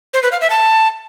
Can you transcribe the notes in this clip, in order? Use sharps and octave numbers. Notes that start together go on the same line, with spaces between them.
C5
B4
F5
E5
A5